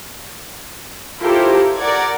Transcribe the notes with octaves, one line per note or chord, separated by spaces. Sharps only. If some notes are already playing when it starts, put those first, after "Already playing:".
E4 F4 G4 A4 A#4 C5
A#4 D5 F#5 G#6